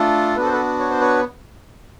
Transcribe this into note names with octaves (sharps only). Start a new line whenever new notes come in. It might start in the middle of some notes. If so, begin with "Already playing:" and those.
Already playing: A3 D4 F4 A4
B3 D4 F#4 A4 B4
C5
A4 B4
C#5
C5
B4 C#5